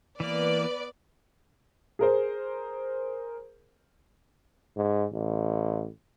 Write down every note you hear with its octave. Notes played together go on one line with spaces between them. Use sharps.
E3 A#3 B3 B4 D5
G#4 A#4 C5
G#2
A1